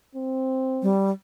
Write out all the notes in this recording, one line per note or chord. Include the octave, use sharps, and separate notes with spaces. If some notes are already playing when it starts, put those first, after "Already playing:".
C4
G3